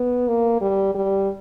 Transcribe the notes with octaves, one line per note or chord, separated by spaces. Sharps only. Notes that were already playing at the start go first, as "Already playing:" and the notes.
Already playing: B3
A#3
G3
G3